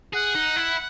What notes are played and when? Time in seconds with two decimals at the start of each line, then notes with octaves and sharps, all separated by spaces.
0.13 G#4 F#5
0.36 D#4
0.57 E4